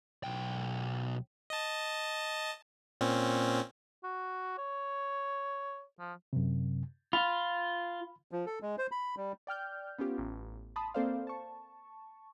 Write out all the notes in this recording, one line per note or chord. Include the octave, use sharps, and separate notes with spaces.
B1 G5
D#5 A5
A#2 C4 C#4
F#4
C#5
F3
F#2 C3
F4 B5
F3
A4
G#3
C5
B5
G3
D5 G5 F6 G6
B3 C#4 F4 G4
A1
A5 B5 C6 D#6
A#3 C4 A4 C5 D5 F5
A5 C#6